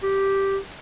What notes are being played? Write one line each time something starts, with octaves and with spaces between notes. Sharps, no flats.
G4